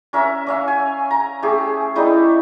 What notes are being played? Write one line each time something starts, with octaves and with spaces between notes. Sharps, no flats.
C#4 A#4 E5
C#4 E5 F5
G#5
A#5
A3 G4 G#4
G3 A3 D#4 E4